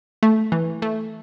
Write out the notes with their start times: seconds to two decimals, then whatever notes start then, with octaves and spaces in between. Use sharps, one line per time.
0.23 A3
0.52 E3
0.82 A3